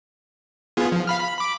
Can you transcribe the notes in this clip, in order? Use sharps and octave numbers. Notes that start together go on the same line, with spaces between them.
B3 F4 G#4
F3
F5 B5 F6
B5
B5 D6